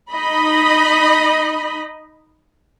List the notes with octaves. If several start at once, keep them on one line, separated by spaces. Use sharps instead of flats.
D#4 D#5 B5